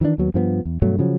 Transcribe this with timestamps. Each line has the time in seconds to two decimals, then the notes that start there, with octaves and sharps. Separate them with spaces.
0.01 D#3 E3 G3 D4
0.18 D#2 F#3 B3
0.34 G2 F3 A#3 B3
0.65 E2
0.82 G2 B2 F#3 A3
0.99 C#3 F3 F#3